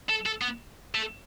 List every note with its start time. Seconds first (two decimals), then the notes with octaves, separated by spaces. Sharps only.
0.09 A4
0.26 A4
0.41 B3
0.95 A3